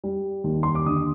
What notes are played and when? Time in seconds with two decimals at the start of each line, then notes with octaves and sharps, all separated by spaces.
0.04 G3
0.44 D#2
0.63 C6
0.75 D6
0.86 D3 D#6